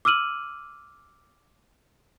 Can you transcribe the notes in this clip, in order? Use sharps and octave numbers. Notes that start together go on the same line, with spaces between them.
D6 E6 F6 D#7 F#7